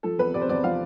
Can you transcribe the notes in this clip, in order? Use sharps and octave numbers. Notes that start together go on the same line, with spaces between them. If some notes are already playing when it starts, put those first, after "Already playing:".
F3 A4
E2 B4
C3 D5
C5
E2 D5
F3 F5